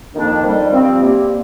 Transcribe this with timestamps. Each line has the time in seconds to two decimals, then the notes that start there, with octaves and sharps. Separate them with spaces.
0.13 F2 D#3 A#3 D4
0.42 F2 D#3 G3
0.71 G2 F3 C4 F4
1.00 C3 G3 A#3